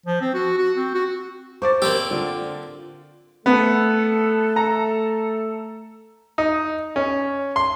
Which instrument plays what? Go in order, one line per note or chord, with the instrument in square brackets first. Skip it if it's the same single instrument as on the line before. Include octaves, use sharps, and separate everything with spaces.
[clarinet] F3
C4
F#4
F#4
C4
F#4
[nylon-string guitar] C5 [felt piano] C#6 D6 A6
[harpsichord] A#3 C4 G4 [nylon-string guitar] C#5 D5 [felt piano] E6
[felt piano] D3 [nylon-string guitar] F4 D5
[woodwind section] A3 A4 [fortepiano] B3
[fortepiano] A#5
D#4
C#4
C6